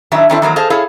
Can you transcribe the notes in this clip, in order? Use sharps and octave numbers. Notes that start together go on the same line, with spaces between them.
A2 D#3 F#3 D4 E5
D#3 A3 C4 D4 E4 A4
D#3 E3 F#3 A#3
G#4 A4 C5 D#5 F5 A5
E4 G#4 A4 C#5 F5